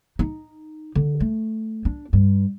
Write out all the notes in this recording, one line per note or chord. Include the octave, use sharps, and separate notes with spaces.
D#4
D3
A3
D4
G2